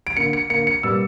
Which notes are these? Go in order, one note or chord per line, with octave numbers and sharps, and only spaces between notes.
D7
D3 A#3 C#7
C#7
D3 A#3 C#7
C#7
B2 G3 A#3 E6